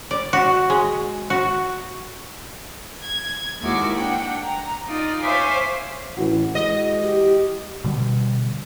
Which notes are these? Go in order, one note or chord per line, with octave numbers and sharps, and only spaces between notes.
D5
F#4
G#3
F#4
G#6
D#2 G#3 A#3 E4 F#4 D6
D4 F#5 G5
A#5
D#4 F4 D5
C5 C#5 E5 F5 G#5 D6
A1 E3 F#4
G#3 D#5
G4
B2 D3 G3